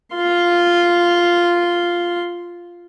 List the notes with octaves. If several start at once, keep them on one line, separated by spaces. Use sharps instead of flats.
F4 C6